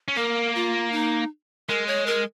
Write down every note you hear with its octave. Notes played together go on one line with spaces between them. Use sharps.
C#4
A#3 A#4
F4
D#4
G#3 A#4
C#5
A#4